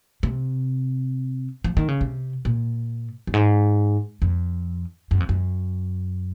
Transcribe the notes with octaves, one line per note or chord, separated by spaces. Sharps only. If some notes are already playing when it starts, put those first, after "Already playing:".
C3
F3
D#3
C#3
C3
A#2
F#2
G#2
F2
F#2
F2
F#2